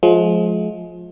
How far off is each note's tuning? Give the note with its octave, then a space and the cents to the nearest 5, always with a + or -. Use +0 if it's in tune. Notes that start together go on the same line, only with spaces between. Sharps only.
F3 +20 G#3 +35